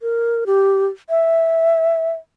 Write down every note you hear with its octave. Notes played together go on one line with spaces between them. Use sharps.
A#4
G4
E5